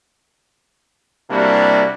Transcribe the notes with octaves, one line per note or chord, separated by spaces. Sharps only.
C3 G3 A#3 D4 E4 F#4